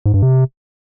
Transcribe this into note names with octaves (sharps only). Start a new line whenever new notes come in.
G#2
G2
C3